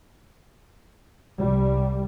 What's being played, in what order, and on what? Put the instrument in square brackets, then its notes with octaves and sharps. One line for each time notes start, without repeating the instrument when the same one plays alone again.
[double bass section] C2 G3